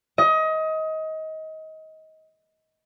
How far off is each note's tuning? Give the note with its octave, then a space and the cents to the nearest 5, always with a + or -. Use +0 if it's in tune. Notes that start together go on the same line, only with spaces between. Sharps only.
D#5 +25